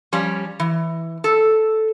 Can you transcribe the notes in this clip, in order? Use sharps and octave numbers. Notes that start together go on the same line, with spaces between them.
F3 G3 C#4 D5
E3
A4